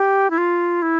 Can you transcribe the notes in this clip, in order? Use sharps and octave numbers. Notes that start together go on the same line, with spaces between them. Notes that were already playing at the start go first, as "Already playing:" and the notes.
Already playing: G4
E4
F4
E4